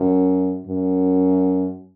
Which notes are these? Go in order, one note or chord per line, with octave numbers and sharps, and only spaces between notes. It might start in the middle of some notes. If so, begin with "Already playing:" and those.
Already playing: F#2
F#2